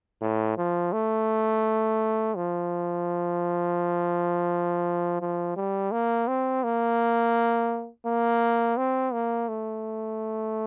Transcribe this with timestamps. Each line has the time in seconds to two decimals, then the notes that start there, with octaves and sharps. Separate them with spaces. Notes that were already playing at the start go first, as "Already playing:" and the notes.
0.22 A2
0.57 F3
0.93 A3
2.36 F3
5.21 F3
5.56 G3
5.92 A#3
6.28 C4
6.64 A#3
8.06 A#3
8.77 C4
9.13 A#3
9.48 A3